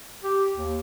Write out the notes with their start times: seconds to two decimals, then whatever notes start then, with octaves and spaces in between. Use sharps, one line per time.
0.23 G4
0.55 D#2